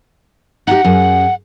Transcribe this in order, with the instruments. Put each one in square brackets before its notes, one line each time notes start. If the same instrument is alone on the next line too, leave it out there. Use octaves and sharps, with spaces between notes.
[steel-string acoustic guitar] D#4 F#4 G4 [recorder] F#5
[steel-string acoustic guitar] F#2 G#4